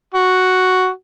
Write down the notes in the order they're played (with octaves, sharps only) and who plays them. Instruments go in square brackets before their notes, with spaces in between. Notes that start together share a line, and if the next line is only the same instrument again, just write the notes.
[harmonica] F#4